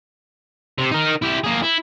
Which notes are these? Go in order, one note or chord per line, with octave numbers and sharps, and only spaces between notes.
C3
D#4 A#4
E4 G4
A#3 G#4
E4